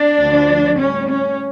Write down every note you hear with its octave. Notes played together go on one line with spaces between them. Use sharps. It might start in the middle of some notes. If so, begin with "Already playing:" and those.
Already playing: D4
D2 D3 F3
A2 G3 C#4
C#4